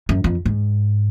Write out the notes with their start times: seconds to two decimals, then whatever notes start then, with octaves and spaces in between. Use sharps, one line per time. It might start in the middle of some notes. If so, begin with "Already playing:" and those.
0.09 F#2
0.24 F2
0.46 G#2